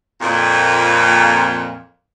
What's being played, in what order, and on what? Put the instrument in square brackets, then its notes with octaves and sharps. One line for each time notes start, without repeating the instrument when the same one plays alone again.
[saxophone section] F2 A#2